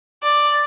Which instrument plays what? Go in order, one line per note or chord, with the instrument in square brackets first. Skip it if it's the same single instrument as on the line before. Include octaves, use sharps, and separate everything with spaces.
[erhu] D5